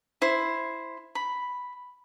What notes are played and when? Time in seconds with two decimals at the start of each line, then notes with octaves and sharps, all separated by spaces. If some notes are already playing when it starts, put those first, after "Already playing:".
0.22 E4 C5
1.15 B5